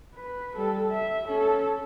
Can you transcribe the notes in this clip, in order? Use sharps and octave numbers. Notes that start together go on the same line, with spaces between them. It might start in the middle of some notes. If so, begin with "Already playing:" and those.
B4
G3 A4
E5
C#4 A4